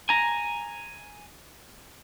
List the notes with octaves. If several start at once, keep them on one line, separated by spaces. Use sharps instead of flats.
G#5 A#5